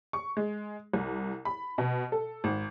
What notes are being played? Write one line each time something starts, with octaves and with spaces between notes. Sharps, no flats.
C#6
G#3
C2
B5
B2
A4
G#1